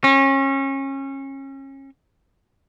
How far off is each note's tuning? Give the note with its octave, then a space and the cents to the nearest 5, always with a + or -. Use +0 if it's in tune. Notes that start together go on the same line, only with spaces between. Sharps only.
C#4 -30